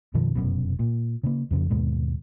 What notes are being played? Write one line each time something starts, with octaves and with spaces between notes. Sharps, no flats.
F#2 B2 D#3 F3
F1 F#2 B2
A#2
C#3 A#3
F2 C#3 F3
D#2 G#2 B2 G#3